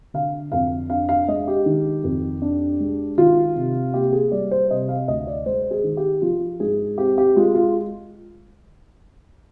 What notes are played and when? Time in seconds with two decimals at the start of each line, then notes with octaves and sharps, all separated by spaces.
0.14 D3 F5
0.52 F2 F5
0.90 D4 F5
1.09 F5
1.28 G#3 D#5
1.48 G4
1.66 D#3
2.04 F2
2.42 D4
2.80 G#3
3.18 D#3 F4
3.56 C3
3.94 A#3 G4
4.13 G#4
4.32 G3 D5
4.51 C5
4.70 C3 D#5
4.89 F5
5.08 D2 D#5
5.27 D5
5.46 G#3 C5
5.71 G#4
5.84 D#3
5.97 G4
6.22 F3 F4
6.60 G#2 G#4
6.98 C4 G4
7.18 G4
7.36 G#3 F4
7.55 F4